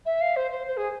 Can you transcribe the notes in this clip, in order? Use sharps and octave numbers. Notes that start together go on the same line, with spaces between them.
E5
F5
C5
C5
C5
G#4